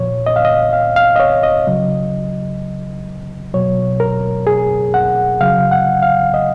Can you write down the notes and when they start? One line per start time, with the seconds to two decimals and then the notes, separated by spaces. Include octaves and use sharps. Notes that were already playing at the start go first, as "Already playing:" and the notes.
Already playing: A#2 F3 C#5
0.26 D#5
0.36 F5
0.45 D#5
0.73 F5
0.96 F5
1.16 D#5
1.20 C#5
1.43 D#5
1.67 C#3 F#3
3.54 B2 F#3 C#5
4.00 A#4
4.47 G#4
4.94 F#5
5.41 C#3 F#3 F5
5.71 F#5
6.03 F5
6.34 D#5